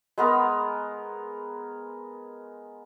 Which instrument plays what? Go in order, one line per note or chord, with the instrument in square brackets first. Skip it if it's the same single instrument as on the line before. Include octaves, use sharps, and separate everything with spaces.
[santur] G#3 B3 A#4